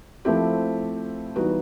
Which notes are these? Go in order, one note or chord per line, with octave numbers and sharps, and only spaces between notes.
F3 A3 C4 E4 G4
E3 G3 B3 D#4 F#4